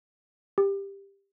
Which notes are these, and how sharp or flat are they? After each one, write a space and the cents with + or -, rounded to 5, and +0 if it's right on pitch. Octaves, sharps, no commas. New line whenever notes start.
G4 +15